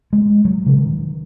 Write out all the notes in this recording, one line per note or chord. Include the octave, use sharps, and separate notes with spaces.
G#3
F#3
C#3
D#3